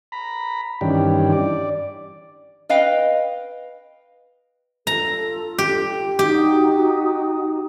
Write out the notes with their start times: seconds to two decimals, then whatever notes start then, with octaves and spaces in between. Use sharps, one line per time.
0.12 A#5 B5
0.81 G2 D#3 E3 C#4 D4 G4
1.32 D5
2.69 B4 D#5 F5 G5
4.87 F4 A4 A#5
5.58 G4
6.19 D#4 F#4 G4 D#6